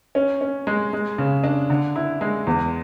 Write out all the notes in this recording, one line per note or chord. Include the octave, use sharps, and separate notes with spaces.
C#4
C#4
G#3
G#3
C#3
D4
D3
E4
G#3
E2